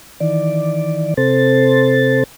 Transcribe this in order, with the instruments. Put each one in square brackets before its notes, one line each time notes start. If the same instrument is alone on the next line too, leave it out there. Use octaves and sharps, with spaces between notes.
[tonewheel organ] D#3 E3 D5
C3 C4 A4 C5 A6